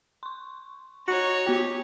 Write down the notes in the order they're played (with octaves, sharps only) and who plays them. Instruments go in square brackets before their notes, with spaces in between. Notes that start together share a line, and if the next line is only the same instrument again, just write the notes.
[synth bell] C6 C#6
[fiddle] D#4 C#5 [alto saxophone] F#4
[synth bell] B3 F#4 G5 [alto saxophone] G4